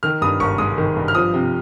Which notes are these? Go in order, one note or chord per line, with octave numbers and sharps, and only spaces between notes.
D#3 F6
G2 D#6
G#1 C#6
G#3 D#6
D#3
G2
F6
F3 D#6
C3